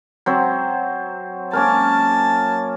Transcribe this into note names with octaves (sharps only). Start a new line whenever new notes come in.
F#3 C4 C5
A#3 C#4 A#4 A5